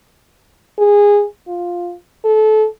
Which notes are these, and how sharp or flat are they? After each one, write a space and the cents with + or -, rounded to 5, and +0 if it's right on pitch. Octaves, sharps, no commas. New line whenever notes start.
G#4 -15
F4 +5
A4 -25